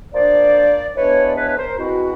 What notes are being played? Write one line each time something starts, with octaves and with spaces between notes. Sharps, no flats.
F3 A#3 D4 C5 D5
E3 G#3 B3 D4 B4 C#5
D5
B4 C#5
B4
A#4 C5
B2 G#3 C4 E4 F#4